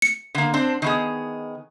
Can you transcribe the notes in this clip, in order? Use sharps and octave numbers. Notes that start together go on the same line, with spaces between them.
C#7
D3 A#3
C4 D4 C5
D#3 B3 G#4